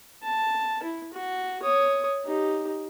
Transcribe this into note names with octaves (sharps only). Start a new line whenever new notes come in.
A5
E4
F#4
C#5 D#6
D#4 G4